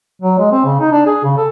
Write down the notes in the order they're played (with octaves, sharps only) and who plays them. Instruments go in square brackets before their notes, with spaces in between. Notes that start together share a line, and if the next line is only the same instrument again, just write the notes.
[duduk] F#3
G#3
C4
C#3
D#4
D4
G#4
C#3
A4